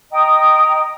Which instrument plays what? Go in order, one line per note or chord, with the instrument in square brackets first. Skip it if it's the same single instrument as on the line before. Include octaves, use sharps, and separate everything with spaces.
[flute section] D#5 G5 A#5 D#6